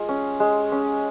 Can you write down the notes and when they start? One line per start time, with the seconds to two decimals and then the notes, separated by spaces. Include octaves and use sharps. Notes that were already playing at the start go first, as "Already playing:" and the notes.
Already playing: G#3 F4
0.09 C#4
0.40 G#3
0.72 C#4